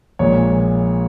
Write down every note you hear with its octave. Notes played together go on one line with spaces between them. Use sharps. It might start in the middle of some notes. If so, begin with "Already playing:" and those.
A#1 A#2 G#3 C#5